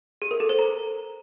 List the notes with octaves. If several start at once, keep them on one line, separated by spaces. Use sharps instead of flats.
G#4
A#4
A4
C5
A#5